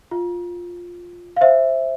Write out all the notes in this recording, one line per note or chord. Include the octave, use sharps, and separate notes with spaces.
F4
F5
C5 E5